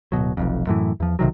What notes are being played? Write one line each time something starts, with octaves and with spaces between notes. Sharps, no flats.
D1 G#1 B2 F#3
F1 B1 F2
F#2 A2 E3
E2 F3
B1 C3 D#3 F#3